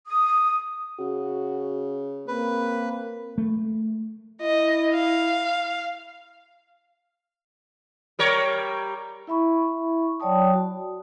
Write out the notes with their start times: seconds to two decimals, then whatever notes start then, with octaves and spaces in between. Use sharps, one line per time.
0.09 D#6
1.00 C#3 F#4
2.28 A#3 C4 B4
3.38 A3
4.42 E4 D#5
4.94 F5
8.19 G3 A#4 C#5
9.27 E4 E5 B5 C#6
10.20 F#3 C#5 D5 G5 A5 D#6
10.53 F#4